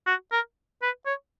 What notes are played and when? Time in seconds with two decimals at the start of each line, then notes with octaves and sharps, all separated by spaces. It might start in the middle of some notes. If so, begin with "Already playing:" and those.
0.07 F#4
0.32 A#4
0.82 B4
1.06 C#5